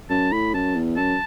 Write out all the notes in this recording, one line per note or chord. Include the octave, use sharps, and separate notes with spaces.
F#2 A5
A2 B5
F#2 A5
E2
F#2 A5